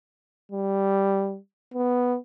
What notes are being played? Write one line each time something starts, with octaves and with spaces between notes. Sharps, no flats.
G3
B3